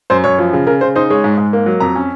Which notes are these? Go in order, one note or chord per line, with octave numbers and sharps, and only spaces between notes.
F#2 C5
F#2 C#5
F3
C#3
C#3 A#4
C#3 C5
D#4 C5
G#3 C#5
G#2
G#2
A#3
F#3
F2 A#5
C#4